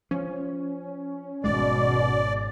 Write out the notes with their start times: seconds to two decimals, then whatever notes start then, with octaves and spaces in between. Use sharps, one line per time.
0.11 F3 C#4
1.44 G#1 G#2 B2 G#3 D5